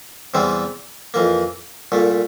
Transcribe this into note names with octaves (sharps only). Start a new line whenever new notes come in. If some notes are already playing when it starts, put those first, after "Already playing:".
E2 C3 E3 G3 C4
F2 E3 A#3
C2 A#2 A3